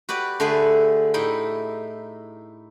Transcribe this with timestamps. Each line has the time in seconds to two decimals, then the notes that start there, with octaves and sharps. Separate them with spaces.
0.09 F#4 G4 B4 D5
0.40 D3 A3 G4 G#4 B4
1.14 A2 D#4 E4 G5